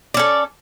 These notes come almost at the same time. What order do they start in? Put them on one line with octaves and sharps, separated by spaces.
D5 C#4 A4